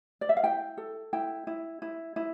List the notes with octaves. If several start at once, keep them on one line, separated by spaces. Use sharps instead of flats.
D5
E5
F5
E4 G5
A4
E4 G5
E4
E4
E4